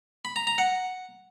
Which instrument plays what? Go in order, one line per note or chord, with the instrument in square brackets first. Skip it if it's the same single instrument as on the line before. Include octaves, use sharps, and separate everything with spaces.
[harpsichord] B5
A#5
A#5
F#5